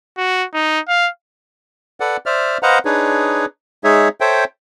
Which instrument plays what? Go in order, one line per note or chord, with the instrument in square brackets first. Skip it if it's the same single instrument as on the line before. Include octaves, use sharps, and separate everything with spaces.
[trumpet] F#4
D#4
F5
[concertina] A4 B4 D5 F#5
C5 D5 E5 F6
B4 C5 D#5 F5 F#5 A#5
D4 D#4 G#4 B4 C#5
G#3 D#4 G#4 C#5 E5
A4 C5 C#5 E5 G5